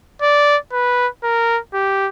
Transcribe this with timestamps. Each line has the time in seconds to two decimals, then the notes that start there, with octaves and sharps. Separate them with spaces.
0.22 D5
0.72 B4
1.24 A#4
1.74 G4